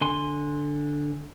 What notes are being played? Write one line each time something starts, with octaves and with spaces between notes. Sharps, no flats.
D3 G#5 C6